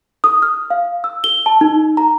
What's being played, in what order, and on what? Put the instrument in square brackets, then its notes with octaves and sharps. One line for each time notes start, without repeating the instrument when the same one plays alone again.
[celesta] D#6
F6
F5
E6
G7
A5
D#4
A#5